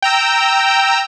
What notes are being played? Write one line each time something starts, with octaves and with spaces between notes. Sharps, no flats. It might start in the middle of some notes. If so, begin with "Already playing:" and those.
G5 A#5 E6